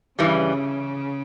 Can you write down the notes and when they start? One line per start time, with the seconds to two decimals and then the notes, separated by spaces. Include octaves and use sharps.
0.19 G2 C#3 E3 G3